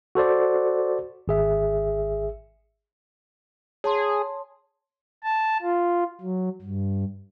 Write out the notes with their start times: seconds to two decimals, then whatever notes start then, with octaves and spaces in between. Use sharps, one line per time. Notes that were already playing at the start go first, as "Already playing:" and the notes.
0.15 F#4 A4 C5 D5
1.28 G#1 G#4 E5
3.84 G#4 C#5 A5 C6
5.24 A5
5.61 F4
6.21 F#3
6.62 G2